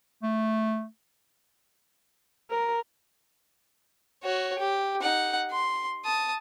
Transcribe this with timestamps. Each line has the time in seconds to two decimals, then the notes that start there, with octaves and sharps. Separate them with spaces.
0.23 A3
2.51 A#4
4.23 F#4 C#5
4.59 G4
5.01 D#4 F#5
5.51 C6
6.05 A5 D#6